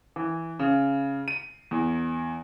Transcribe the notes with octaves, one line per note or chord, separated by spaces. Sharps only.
E3
C#3
D#7
E2